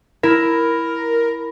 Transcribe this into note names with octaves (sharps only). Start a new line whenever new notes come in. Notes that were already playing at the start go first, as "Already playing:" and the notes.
E4 A#4